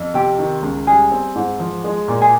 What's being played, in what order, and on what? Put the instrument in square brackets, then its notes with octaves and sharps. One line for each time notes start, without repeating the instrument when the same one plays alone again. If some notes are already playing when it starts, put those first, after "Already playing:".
Already playing: [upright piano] F2
[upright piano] C3 [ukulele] G4
[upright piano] D#3
C#2
[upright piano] G3 [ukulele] G#4
[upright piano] C4
G#2
F3
G#3
A#2
[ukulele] G#4